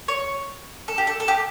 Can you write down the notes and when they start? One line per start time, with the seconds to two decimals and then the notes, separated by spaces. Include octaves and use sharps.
0.08 C#5
0.88 A4
0.98 G4
1.07 A4
1.20 A4
1.28 G4